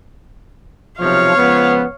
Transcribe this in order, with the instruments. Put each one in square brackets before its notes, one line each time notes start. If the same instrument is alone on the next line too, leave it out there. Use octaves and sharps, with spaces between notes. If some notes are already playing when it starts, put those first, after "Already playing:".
[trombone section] B1 C3 F3 [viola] C#5 F5
[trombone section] C#2 F3 B3